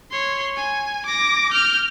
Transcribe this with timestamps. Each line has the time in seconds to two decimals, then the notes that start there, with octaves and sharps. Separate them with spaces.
0.11 C#5 C6
0.57 G#5
1.06 D6 A#6
1.52 F6 G6